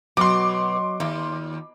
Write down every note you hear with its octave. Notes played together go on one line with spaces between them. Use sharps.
B2 F#3 C6 D6
D#2 F4